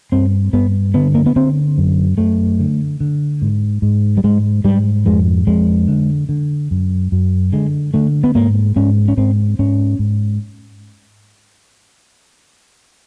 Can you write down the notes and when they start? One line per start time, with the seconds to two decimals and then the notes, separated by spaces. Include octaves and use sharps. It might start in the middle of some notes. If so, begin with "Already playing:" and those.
0.12 G2 C4
0.53 G2 B3
0.94 D3 B3
1.15 A#3
1.26 B3
1.36 D3 C4
1.78 F#2
2.18 F#2 A3
2.60 D3
3.00 D3
3.42 G#2
3.82 G#2
4.17 G3
4.24 G#2 G#3
4.64 G#2 G3
5.05 F2 G#3
5.47 F2 G#3
5.88 D3
6.29 D3
6.71 F#2
7.12 F#2
7.52 D3 G#3
7.94 D3 A3
8.24 B3
8.35 G#2 A#3
8.76 G#2 C#4
9.08 C#4
9.17 G#2 C4
9.59 G#2 C#4
9.99 G#2